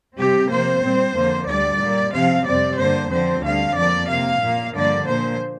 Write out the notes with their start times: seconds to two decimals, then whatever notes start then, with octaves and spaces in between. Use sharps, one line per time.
0.17 C3 G3 C4 G4
0.50 C3 F3 A#3 C5
0.82 A#2 G3 C4
1.15 F2 D3 A#3
1.47 D2 D3 G3 D5
1.79 A#2 G3 A#3
2.13 C3 F3 C4 F5
2.44 F2 C3 G3 C4 D5
2.77 G2 D3 A#3 C5
3.10 F2 D3 F3 C4 C5
3.42 D2 D3 G3 F5
3.75 F2 F3 A#3 D5
4.08 C3 A#3 F5
4.41 A#2 A#3
4.72 G2 D3 F3 A#3 D5
5.05 A#2 F3 A#3 C5